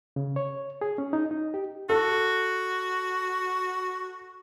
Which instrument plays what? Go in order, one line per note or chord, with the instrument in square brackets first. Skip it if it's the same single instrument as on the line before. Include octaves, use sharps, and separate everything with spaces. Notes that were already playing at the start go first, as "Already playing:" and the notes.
[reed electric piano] C#3
C#5
G#4
C#4
D#4
D#4
G4
[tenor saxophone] F#4 [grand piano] A4